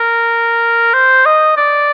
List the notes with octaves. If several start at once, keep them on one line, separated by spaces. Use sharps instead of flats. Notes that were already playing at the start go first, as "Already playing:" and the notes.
Already playing: A#4
C5
D#5
D5